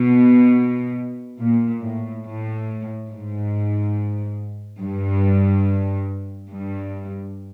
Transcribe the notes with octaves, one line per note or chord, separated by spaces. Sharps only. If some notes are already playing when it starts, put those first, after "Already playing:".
Already playing: B2
A#2
A2
A2
G#2
G2
G2